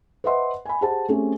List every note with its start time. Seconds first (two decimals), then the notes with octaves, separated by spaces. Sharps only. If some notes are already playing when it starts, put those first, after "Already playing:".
0.24 B4 C5 D#5 E5 F#5 C6
0.65 G#5 B5
0.81 G4 G#4 C5 F#5 A5
1.09 A3 C4 C#4 G4 G#4